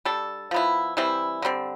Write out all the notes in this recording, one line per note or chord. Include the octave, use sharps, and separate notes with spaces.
G3 D4 A4
F3 B3 E4
E3 G3 C4 E4
D3 G3 C4